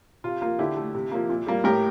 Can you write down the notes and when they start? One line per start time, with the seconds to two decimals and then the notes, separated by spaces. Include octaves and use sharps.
0.24 C3 F4
0.41 F3 A#3 F4
0.59 D3 E4 G4
0.77 A3
0.95 C3
1.12 F3 A#3
1.29 A#2
1.47 G3 A#3
1.64 A2 G4 A#4